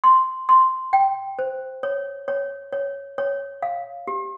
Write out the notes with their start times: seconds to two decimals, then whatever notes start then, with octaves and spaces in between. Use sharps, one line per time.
0.04 C6
0.49 C6
0.93 G5
1.39 C5
1.83 C#5
2.28 C#5
2.73 C#5
3.18 C#5
3.62 F5
4.07 G4